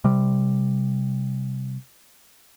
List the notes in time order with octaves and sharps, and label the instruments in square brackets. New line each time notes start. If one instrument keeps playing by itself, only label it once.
[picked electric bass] C3 G3